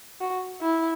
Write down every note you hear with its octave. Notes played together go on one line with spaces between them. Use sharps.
F#4
E4